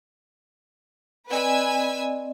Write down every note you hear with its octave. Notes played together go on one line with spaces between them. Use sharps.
C4 B4 D5 D#5 G#5 E6